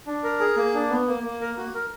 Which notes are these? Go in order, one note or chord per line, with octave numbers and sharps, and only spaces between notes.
D4
A#4
G#4
A#3
D4
B3
A#3
A#3
A#4
F#4
A#4